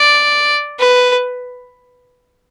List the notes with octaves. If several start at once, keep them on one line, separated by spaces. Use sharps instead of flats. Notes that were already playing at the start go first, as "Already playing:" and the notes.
Already playing: D5
B4